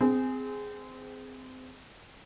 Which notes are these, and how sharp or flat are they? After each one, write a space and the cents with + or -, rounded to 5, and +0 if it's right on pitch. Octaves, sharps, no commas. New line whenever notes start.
C4 -25 G#4 +0